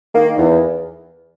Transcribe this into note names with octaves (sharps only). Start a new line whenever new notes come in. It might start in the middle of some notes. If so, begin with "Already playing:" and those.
D#3 A#3
E2